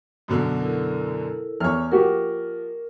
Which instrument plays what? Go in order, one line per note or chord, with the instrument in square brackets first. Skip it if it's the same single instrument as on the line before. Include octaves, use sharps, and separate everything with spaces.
[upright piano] F#2 B2 D3
[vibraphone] E4 A4 A#4
[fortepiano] E2 [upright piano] C#5 F6
[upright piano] F3 [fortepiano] A#3 F#4 G4 [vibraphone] A#4